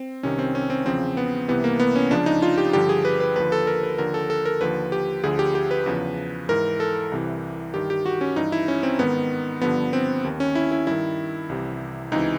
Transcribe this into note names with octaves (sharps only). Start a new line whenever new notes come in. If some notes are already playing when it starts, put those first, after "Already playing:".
Already playing: C4
C2 C3 D#3 C#4
C4
C#4
C4
E2 C#3 F3 C4
B3
C2 C3 E3 B3
A#3
B3
C#4
C#2 C#3 F3 D4
D#4
F4
G4
G2 D3 F3 G4
G#4
B4
B4
D#2 D3 F3 B4
A4
A#4
B4
D#2 D3 F3 A#4
A4
A4
A#4
D#2 D3 F3 B4
G4
D2 D3 F3 G#4
G4
G4
B4
E2 C#3 F3
G#2 E3 A#4
A4
C2 C3 E3
G2 D#3 G4
G4
F#4
C#4
G2 E3 D#4
E4
C#4
C4
G#2 D#3 B3
G2 D3 F3 B3
C4
D#2 D#3
C#4
E4
E4
G2 D#3 E4
C2 C3 E3
C#2 C3 E3 D#4